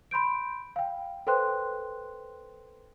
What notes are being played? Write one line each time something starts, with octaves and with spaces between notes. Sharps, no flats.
B5 C6 G6 D7
F5 G5
A4 B4 C5 G5 C6 F#6